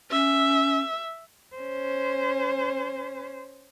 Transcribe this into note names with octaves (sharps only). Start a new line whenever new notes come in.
C#4 E5
C#4 C5